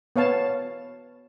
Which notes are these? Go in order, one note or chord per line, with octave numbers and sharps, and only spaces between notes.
B3 C#5 F5 A5